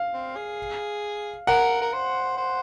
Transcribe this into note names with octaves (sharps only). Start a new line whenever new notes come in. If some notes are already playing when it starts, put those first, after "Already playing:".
Already playing: F5
C4
G#4
A#4 F#5
A#4
C5
C5